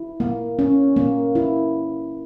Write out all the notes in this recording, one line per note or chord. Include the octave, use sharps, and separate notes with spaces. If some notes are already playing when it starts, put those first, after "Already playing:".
Already playing: E4
A#3
C#4
A#3
E4